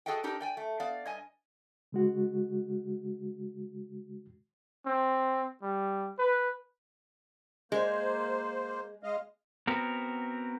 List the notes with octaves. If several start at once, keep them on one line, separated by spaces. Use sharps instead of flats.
F#4 G#4 A4 D#5 F#5 G5
D4 D#4 G4 A#4
D5 G5 G#5
A3
B3 D5 F5
G2 D#5 G#5
C#3 G#3 F#4
C4
G3
B4
G#3 A#3 C5
G#3 D#5 F5
B3 C4 F#4 A#4